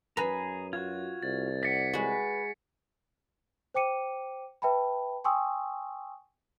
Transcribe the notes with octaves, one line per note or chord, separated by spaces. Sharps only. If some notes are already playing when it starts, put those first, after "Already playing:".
F#2 G#4 B4 G#5 A#5
F4 F#4 G#6
C2 A6
D5 F#5 B6 C#7
G#3 F#4 B4
C5 G5 D6 C#7 D#7
B4 E5 G5 A5 B5
G5 G#5 C6 C#6 D#6 E6